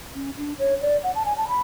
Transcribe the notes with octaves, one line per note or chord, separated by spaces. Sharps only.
C#4
D4
C#5
D5
F#5
A5
G#5
A5
B5